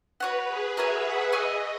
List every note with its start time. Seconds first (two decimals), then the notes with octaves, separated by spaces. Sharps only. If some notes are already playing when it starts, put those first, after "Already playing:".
0.20 F#4 B4 C#5 F#5
0.48 G#4
0.76 F#4 A#4 C#5 E5 G#5
1.05 F#5
1.32 G#4 C#5 D#5 E5 G#5